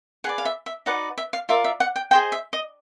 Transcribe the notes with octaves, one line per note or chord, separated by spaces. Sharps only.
G#4 B4 D5 F#5
F5
E5
E5
D#4 F#4 B4 D5 F#5
E5
F5
F4 A#4 D5 E5
E5
F#5
G5
G#4 C5 D#5 G5
E5
D#5